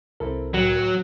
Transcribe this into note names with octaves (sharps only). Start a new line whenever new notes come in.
C2 C4 E4 A4 A#4
D1 F#3 F#4